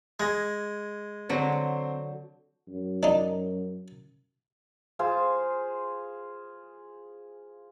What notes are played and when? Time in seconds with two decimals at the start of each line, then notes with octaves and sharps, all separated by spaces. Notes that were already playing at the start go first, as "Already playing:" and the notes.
0.20 G#3 G#6 A#6
1.29 D3 F#3 C4 C5
2.69 F#2
3.03 D4 D#4
4.99 F4 G#4 C5 F5